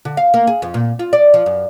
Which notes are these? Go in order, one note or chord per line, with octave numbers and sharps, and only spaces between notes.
D3
F5
A#3
G#4
F2
A#2
F4
D5
F3
F#2